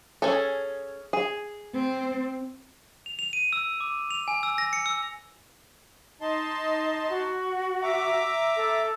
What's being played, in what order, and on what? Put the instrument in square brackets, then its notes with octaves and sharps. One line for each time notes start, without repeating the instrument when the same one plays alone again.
[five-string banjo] C#4 G#4 A4
G#4
[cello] C4
[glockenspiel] F7
F7
D#7
E6
D6
F7
G#5
E6
A#6
C#7
E6
[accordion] D#4 A5 C6 [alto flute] D#5
[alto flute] F#4
[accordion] E5 A#5 D6
[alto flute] A4